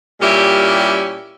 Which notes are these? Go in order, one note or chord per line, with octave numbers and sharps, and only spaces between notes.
A#2 G3 C#4 E4 G4